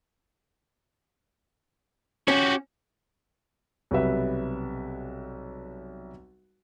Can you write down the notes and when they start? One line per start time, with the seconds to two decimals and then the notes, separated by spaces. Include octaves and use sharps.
2.28 C#4 F#4 G4
3.91 B1 C3 G3 B4 E5